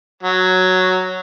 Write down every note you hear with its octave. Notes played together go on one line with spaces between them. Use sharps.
F#3